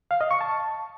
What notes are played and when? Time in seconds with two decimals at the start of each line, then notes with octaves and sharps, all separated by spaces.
0.11 F5
0.21 D#5
0.31 C#6
0.41 A5